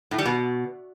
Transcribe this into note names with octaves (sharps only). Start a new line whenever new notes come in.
A2
G3
B2